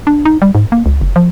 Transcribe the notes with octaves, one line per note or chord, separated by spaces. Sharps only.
D4
D#4
G3
G#2
A#3
C#2
F#1
F3